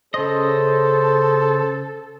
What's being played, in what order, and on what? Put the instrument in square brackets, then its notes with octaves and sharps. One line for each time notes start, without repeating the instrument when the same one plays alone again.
[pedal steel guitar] C#3 D#5 [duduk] A4 [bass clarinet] C5